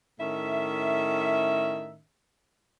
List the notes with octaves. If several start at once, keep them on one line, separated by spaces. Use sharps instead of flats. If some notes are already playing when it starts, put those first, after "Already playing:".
A2 D#3 C#4 E5